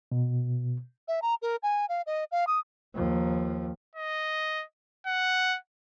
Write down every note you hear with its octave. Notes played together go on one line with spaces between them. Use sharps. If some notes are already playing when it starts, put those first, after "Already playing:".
B2
E5
A#5
A#4
G#5
F5
D#5
F5
D#6
D#2 F3
D#5
F#5